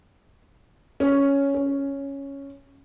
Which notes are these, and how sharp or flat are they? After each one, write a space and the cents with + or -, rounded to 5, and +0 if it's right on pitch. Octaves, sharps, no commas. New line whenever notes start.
C#4 +5
C#4 +0